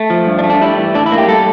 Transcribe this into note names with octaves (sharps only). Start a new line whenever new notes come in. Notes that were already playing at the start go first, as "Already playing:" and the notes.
Already playing: A3
F3
G2
D4
A3
D4
G3 E4
E3
A2 D4
E4
A#3
G4
G3 A4